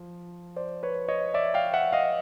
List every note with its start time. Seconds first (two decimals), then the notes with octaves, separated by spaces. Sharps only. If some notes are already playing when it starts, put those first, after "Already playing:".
Already playing: F3
0.56 C5 D5
0.83 B4 C#5
1.08 C#5 D#5
1.34 D5 E5
1.54 F5 G5
1.73 E5 F#5
1.93 D#5 F5